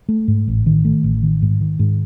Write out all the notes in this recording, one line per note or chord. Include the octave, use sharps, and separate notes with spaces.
A3
G#2
A1
D#3
A3
A1
D#3
G#2
D#3
G#2